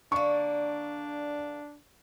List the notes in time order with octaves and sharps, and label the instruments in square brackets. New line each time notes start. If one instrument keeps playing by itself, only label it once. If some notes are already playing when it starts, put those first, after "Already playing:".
[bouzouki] D3 A#3 [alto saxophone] D4 [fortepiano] C#6